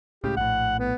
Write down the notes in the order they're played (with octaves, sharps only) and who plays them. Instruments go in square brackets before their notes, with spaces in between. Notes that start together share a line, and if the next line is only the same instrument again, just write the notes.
[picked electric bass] C#2 A2 C#3 [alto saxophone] G4
[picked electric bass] A#1 A2 [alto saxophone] F#5
[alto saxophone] B3